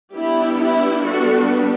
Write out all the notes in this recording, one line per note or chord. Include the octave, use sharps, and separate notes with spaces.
G3 B3 D4 E4 G4
E4 G4
F#4 A4